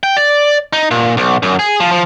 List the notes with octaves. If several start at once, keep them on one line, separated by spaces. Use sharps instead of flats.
G5
D5
D#4
A#2
B1
F#2
G#4
F3
F3